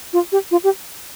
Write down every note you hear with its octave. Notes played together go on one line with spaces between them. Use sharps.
F4
G4
F4
G4